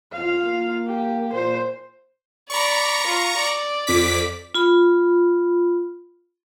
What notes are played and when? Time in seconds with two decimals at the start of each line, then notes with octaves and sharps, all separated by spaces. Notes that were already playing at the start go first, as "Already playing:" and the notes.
0.13 F2 F4 F5
0.44 A#3
0.87 G4
1.33 A#2 C5
2.50 D5 A#5 B5 C#6
3.06 F4
3.37 D5
3.87 F2 D6 B6
4.55 F4 B5